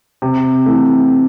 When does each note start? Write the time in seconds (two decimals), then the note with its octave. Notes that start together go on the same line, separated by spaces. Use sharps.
0.22 C3
0.66 E3 A3